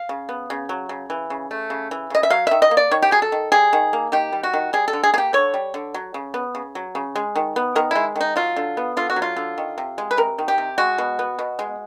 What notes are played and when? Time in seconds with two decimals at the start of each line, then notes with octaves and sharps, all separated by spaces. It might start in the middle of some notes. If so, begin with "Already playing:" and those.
Already playing: F5
0.09 C#3
0.29 B3
0.50 C#3
0.69 F#3
0.89 C#3
1.10 E3
1.30 C#3
1.51 A3
1.70 C#3
1.91 E3
2.10 C#3 D#5
2.23 E5
2.30 F#3 F5
2.47 D#3 E5
2.62 D#5
2.71 A#3
2.77 D5
2.91 D#3 C#5
3.02 G4
3.11 F#3 G#4
3.22 A4
3.32 D#3
3.52 G3 G#4
3.73 D#3
3.93 A#3
4.12 D#3 G4
4.32 G3
4.43 F#4
4.54 D#3
4.73 G3 G#4
4.88 A4
4.93 D3
5.03 G#4
5.14 A#3 G#4
5.18 G4
5.33 D3 C#5
5.54 G3
5.74 D3
5.94 F#3
6.14 C#3
6.34 B3
6.55 C#3
6.75 F#3
6.95 C#3
7.16 G#3
7.36 D#3
7.56 B3
7.76 D#3 A#4
7.91 G#3 E4
8.16 D#3 D#4
8.36 F#3 F4
8.56 D3
8.77 B3
8.97 D3 F4
9.10 F#4
9.16 F#3
9.22 F4
9.36 D3
9.58 D#3
9.78 C3
9.98 G#3
10.11 B4
10.17 C3 A#4
10.39 D#3
10.48 G4
10.58 C3
10.78 G#3 F#4
10.98 B2
11.19 B3
11.39 B2
11.59 G#3